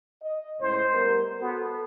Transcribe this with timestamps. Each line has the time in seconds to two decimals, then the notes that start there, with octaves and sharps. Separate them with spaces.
0.23 D#5
0.60 C#2 A2 C5
0.94 G3 B3 A#4
1.40 B3 F#4 A4